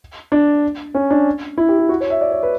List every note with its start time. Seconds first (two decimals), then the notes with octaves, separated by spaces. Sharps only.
0.32 D4
0.95 C#4
1.10 D4
1.58 E4
1.69 G4
1.79 G4
1.89 F#4
2.00 C#5
2.10 E5
2.21 D5
2.32 C#5
2.43 B4